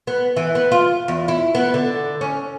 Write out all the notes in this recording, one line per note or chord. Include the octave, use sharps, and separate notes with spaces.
B3
E3
B3
F4
E2
E4
B3
D3
C#4